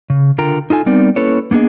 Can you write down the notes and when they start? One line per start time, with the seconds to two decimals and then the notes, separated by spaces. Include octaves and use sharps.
0.10 C#3
0.38 D3 F4 A#4 G5 A#5
0.70 D#4 F4 A4 G#5
0.86 G3 B3 C4 D#4 A#4 D5
1.16 A#3 C#4 E4 A4 B4 C#5
1.51 A#3 B3 D4 G#4 D#5